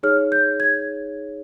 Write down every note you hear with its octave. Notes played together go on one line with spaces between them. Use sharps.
D#4 G#4 C#5 F6
G6
G#6